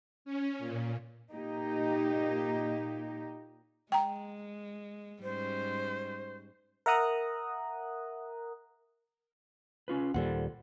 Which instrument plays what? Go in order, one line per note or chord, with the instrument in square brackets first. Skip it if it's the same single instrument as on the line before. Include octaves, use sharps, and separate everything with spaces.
[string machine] C#4
A#2
[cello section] A#2 A#3 D#4 G4
[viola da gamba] G#3 [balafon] G5 A#5
[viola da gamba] G#2 G3 C#4 [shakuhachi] C5
[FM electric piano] A#4 E5 F#5 A#5 D#6 F#6
[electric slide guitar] C#4 F4 B4
[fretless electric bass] D#2 A#2 G3 [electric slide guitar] A4 C5 F#5